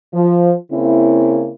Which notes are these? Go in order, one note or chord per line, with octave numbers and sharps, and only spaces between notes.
F3
C#3 A#3 C4 E4